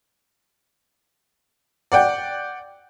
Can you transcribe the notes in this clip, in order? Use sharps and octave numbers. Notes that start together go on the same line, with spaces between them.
D5 F#5 G5